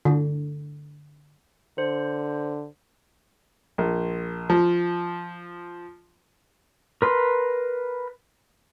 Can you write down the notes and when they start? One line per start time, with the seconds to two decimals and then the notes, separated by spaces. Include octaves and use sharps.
0.05 D3
1.78 D3 C5
3.78 A#1
4.50 F3
7.02 A#4 B4 C6